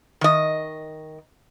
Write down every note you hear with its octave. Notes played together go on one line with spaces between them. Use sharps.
D#3 D#5